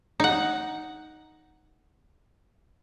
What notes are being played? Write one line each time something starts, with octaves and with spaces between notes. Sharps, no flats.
D#4 F#5